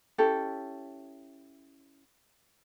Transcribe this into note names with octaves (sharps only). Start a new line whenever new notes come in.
C#4 E4 G4 A4